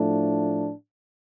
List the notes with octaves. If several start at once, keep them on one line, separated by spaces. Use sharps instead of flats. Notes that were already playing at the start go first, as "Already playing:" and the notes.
Already playing: A2 F3 A3 D4